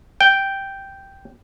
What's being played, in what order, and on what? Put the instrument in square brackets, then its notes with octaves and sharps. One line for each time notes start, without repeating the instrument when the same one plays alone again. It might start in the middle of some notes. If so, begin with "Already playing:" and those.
[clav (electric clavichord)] G5